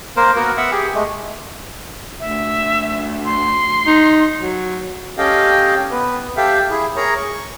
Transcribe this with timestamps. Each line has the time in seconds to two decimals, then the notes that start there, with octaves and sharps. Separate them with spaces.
0.17 A#3 A#4 C5
0.36 A#3 B3 F#4 A#4
0.57 B3 E5 F#5
0.71 G4 G#4
0.95 G#3 A3
2.20 D2 E5
3.25 C6
3.86 D#4
4.41 F#3
5.18 C#4 G4 A4 D#5 F5 G5
5.91 B3 B4
6.37 G4 A4 E5 F5 G5
6.70 E4 G#4
6.96 G#4 A#4 C#5 A#5
7.17 C#6